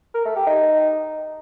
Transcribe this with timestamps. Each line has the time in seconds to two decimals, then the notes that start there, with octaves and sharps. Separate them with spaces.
0.14 A#4
0.25 A3
0.36 G4
0.47 D#4